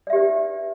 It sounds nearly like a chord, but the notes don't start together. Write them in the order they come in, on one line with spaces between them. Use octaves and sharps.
D5 E5 G4 B4 D#4